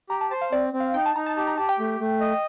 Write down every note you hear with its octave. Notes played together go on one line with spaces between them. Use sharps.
G4 A#5
A5
C5 A5
F5
C4 D5
C4
F5
D#4 G5
A5
D#4 A#5
A5
G4 A5
A#5
G4 A5
G5
A3
A3
D#5